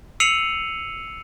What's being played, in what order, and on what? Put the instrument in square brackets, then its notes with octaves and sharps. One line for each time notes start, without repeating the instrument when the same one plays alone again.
[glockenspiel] E6 C7 C#7 D#7 F7 F#7